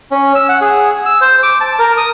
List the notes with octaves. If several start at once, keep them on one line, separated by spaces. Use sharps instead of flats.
C#4
E6
F#5
G#4
E6
C5
D6
A5
A#4
D#6